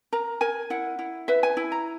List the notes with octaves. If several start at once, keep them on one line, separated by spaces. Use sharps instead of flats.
A#4 A#5
A#4 G#5
E4 F#5
E4
B4 E5
G#5
E4
A#5